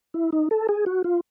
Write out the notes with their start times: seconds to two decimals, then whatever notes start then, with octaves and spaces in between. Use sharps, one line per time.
0.14 E4
0.32 D#4
0.51 A4
0.69 G#4
0.86 F#4
1.04 F4